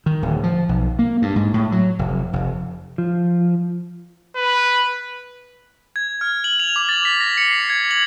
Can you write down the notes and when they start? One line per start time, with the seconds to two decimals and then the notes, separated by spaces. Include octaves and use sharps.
0.06 D#3
0.22 D1
0.43 F3
0.69 B1
0.99 A#3
1.22 G2
1.36 G#2
1.54 A2
1.72 F#3
1.99 F1
2.33 F1
2.98 F3
4.36 B4
5.96 G#6
6.21 F6
6.44 F#7
6.60 F7
6.76 D6
6.89 A6
7.05 B6
7.21 A#6
7.38 C#7
7.51 C7
7.70 G#6
7.91 F#7